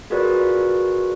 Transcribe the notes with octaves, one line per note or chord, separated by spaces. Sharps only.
F4 F#4 G#4 A#4 B4 D5